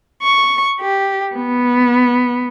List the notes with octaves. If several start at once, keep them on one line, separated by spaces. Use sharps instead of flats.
C#6
G4
B3